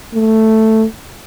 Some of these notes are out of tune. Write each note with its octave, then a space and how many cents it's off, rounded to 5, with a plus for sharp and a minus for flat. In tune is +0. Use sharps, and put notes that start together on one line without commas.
A3 +5